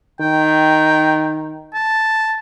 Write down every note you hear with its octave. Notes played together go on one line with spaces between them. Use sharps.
D#3 G5
A5